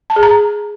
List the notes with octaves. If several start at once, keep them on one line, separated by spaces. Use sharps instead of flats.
A5
G#4
A#5